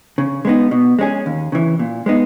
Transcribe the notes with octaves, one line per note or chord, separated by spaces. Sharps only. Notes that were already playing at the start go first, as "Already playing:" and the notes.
C#3
G#3 B3 D#4
B2
G#3 C#4 G#4
D#2
C#3 E3
A#2
G#3 B3 D#4